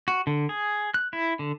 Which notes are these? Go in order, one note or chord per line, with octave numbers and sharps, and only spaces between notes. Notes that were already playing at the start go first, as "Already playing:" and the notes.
F#4
D3
G#4
F#6
E4
D3